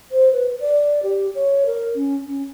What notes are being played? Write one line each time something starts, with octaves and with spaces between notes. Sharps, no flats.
C5
B4
D5
G4
C#5
A#4
C#4
C#4